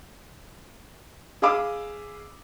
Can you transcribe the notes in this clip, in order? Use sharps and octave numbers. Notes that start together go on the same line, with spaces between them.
G#4 D#5 F5 B5 D6 E6